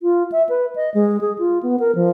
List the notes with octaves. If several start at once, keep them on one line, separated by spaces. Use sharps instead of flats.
F4
E5
B4
D#5
G#3
G#4
F4
B3
A#4
F3